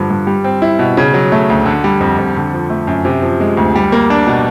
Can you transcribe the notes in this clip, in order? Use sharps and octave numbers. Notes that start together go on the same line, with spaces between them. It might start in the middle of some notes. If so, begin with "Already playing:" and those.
Already playing: G2 D3 F3
G2
G3
C4
E4
B2
C#3
F#3
A3
D2
D3
G3
F2
F2
D3
F3
A3
F#2
C3
F3
G#3
D2
G3
A#3
D4
B2